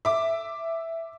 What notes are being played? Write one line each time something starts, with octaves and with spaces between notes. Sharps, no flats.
E5 D6